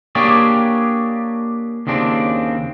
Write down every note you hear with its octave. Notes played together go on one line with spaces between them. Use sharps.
A#3 D4 G4 G#4 C#5 D5
D#2 C#3 C4 D4